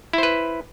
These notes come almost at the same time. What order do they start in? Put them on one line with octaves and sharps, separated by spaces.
E4 C5 B4